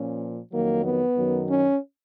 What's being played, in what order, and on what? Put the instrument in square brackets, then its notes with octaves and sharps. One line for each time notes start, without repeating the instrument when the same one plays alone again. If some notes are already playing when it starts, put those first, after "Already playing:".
Already playing: [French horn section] A#2 F3 C#4
F2 D#3 F#3 A#3
B3
F#2 D#3 F#3
C#4